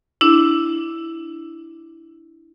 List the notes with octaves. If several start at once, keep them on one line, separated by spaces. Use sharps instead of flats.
D4 E4